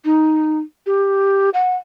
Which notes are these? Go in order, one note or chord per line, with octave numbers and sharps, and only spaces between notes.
D#4
G4
F#5